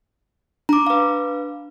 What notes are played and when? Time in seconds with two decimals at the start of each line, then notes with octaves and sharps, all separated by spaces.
0.69 D4 A#5 D6
0.86 B4 F5